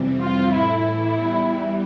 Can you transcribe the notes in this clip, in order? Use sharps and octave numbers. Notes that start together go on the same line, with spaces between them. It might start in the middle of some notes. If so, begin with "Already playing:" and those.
Already playing: F2 C3 E3 G3 C4
F4
A2 E3 A3 E4
E4
E2 E3 G3